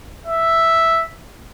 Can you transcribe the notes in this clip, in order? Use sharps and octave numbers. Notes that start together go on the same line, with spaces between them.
E5